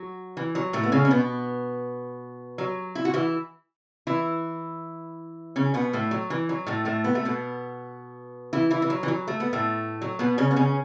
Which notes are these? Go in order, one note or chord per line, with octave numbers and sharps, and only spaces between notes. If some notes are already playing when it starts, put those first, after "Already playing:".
Already playing: F#3 F#4
E3
F#3
A2 A3
B3
C#3 C#4
C#4
B2 B3
F#3
E4
F#4
E3 E4
E3 E4
C#3 C#4
B2 B3
A2 A3
F#3
E3
F#3
A2 A3
A2 A3
B3
A3
B2 B3
E3 E4
E3 E4
E3
F#3
E3
F#3
A3
B3
A2 A3
F#3
B2 B3
C#3 C#4
B3
C#3 C#4